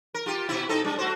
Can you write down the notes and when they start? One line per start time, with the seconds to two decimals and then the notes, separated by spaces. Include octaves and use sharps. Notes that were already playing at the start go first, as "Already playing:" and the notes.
0.14 A#4
0.26 F4 G4
0.49 B2 E4
0.69 C4 D#4 A4
0.84 G3 D4
0.98 A3 F#4 C5